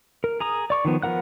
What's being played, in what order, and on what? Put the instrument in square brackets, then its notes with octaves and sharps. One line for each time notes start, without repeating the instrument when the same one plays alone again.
[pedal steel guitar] A#4
G#4 A#5 D#6
D5 C#6 D6
D#3 F3 B3
F3 B3 A#4 F#5 F#6